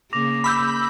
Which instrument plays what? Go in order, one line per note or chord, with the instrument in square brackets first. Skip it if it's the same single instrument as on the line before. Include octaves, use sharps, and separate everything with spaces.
[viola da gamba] C#3 A#3 [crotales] D6 A#6 F7
[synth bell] B5 E6 G6